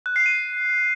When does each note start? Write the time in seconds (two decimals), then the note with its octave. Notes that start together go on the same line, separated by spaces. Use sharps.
0.06 F#6
0.16 C7
0.26 D#7